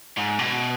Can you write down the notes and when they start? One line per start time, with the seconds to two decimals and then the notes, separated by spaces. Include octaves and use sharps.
0.17 G#2
0.39 B2